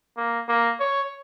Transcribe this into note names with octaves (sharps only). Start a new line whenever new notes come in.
A#3
A#3
C#5